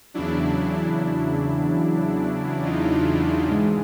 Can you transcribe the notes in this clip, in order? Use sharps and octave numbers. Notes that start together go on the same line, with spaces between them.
E2 C#3 F#3 D4 E4
D#4 F4
G#2 E3 G#3